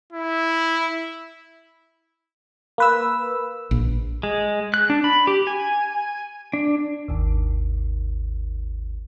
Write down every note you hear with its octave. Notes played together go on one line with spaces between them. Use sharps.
E4
A#3 B4 E6
A#1
G#3
F#6
D4
B5
G4
G#5
D4
G#1 D#2